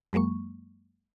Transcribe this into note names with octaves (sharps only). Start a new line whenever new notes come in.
F#2 F#3 G#3 A#3 C#6